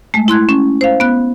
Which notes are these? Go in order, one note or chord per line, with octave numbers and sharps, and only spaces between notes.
G#3 A3
E4 C6 F#6 G#6
C#4
C5 F5
B3 F#6